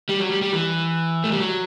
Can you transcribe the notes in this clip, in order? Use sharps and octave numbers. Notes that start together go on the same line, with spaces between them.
G3
F#3
G3
G3
E3
A3
G3
F#3